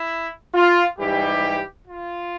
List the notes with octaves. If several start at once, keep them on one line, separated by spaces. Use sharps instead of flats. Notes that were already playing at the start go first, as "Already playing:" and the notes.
Already playing: E4
F4
G#2 E3 G3 G4
F4